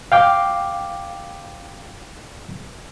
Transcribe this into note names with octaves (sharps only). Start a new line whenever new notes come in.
F5 G5 D6